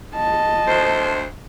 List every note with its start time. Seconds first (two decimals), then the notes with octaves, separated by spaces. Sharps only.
0.15 D#5 A5
0.67 D2 C5